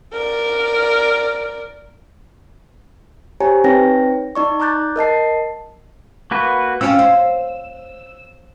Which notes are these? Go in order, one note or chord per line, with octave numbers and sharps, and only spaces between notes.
A#4 D5
G4 C5 C#5 G#5 A#5
C4 D#4 B4 C#5 G5 A#6
D#4 D5 C#6
A#5 D6 F#6 G6 A6
A#4 D#5 A5 C7
A#3 F#4 B4
C4 C#4 F4 E6
C5